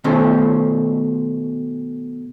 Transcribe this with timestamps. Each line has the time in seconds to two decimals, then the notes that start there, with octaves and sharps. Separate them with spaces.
0.04 B2 D#3 A3 C#4 C5